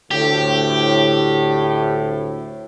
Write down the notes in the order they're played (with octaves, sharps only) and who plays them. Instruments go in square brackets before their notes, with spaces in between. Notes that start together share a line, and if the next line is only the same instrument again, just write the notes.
[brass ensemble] D2 A2 [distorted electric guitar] G4